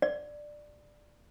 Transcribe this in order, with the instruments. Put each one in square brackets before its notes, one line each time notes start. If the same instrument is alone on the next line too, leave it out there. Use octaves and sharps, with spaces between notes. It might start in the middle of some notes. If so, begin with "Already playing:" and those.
[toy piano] D5